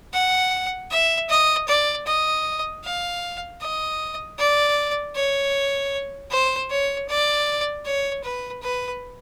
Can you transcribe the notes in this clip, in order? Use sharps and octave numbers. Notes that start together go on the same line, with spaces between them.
F#5
E5
D#5
D5
D#5
F5
D#5
D5
C#5
C5
C#5
D5
C#5
B4
B4